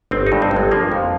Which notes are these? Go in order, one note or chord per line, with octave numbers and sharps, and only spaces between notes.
G1 C4
D#4
G2
C4
G1
G#3
F3 A#3
F2